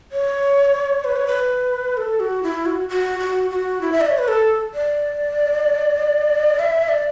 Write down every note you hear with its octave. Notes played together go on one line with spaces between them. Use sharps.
C#5
B4
C#5
B4
A4
F#4
E4
F#4
F#4
F#4
F#4
E4
E5
D5
C#5
B4
A4
D5
E5
D5